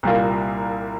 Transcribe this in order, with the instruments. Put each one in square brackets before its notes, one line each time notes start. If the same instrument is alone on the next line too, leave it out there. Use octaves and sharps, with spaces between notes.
[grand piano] C2 A#2 G3 A#3 F4